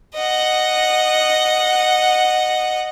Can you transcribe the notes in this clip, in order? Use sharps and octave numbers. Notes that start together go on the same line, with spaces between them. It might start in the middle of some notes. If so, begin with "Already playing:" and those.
D#5 F#5